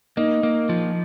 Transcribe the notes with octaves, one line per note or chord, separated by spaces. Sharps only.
A#3 D#4
A#3
F3